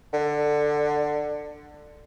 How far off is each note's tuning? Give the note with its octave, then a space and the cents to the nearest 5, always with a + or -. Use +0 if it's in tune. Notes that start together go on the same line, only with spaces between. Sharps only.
D3 +15